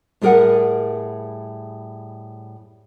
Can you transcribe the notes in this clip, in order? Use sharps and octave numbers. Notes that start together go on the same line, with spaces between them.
A2 G3 G#4 A#4 B4 F#5